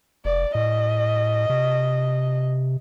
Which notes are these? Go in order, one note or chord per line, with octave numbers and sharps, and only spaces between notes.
F1 D5
A2 D#5
C3